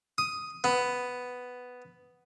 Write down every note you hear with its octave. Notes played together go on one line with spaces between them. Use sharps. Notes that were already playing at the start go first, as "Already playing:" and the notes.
D#6
B3